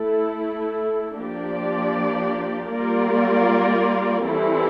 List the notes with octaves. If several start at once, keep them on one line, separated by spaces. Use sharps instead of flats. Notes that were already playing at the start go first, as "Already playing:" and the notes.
Already playing: A3 E4 A4
F3 A#3 D4 G4 D5
G3 A#3 F4 A#4 D5
E3 G3 C4 E4 A4